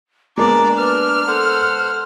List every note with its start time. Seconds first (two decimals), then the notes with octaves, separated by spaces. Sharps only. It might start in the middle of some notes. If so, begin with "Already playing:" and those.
0.38 G#3 A#3 B3 D4 D5 A#5
0.77 B4 F6
1.27 A4 C5 F#5